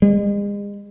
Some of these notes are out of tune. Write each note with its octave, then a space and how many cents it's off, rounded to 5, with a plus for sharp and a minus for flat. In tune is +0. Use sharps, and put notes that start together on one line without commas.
G#3 -40